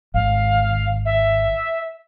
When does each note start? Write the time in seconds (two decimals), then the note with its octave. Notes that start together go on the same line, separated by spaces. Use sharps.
0.14 G#1 F5
1.05 E5